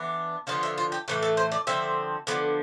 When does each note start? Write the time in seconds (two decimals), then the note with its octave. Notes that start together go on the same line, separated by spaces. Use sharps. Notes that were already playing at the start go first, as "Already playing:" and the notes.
Already playing: E3 B3 D4
0.47 D3 F3 B3 F4 F5
0.63 E5
0.78 F4
0.92 G4
1.08 A2 E3 A3 B4
1.23 A4
1.37 C5
1.52 D5
1.67 D3 F3 C4 E5
2.27 D3 F3 B3